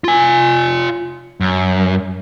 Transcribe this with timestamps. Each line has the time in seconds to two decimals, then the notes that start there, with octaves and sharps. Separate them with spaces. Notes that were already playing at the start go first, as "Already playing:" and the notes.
0.04 F4 G#5
1.41 F#2